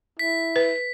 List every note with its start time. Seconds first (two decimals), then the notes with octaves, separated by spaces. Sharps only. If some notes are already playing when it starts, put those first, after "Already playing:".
0.19 E4 B6
0.56 B4